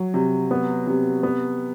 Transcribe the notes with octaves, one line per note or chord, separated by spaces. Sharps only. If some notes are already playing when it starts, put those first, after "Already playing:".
Already playing: F#3
C3
B3
C3
B3